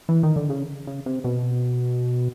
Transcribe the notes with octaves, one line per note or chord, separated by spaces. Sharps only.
E3
D#3
D3
C#3
C#3
C3
B2